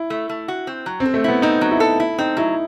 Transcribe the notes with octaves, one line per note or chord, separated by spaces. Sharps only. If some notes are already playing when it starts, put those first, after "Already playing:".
Already playing: E4
A3
A3
F#4
C4
F#3
C4
A4
A3
B3 E4
C4 D#4
F#3
E4
A4
E4
C4 D#4
F#3 E4